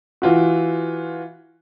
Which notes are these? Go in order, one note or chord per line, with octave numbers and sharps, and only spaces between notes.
E3 F4 F#4